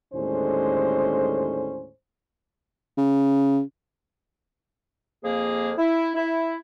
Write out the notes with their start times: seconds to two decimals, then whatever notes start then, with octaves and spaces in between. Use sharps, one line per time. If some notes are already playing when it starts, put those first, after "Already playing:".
0.13 D#2 A2 D3 G#3 C#4 C5
2.97 C#3
5.24 F2 A#3 G#4
5.78 E4
6.15 E4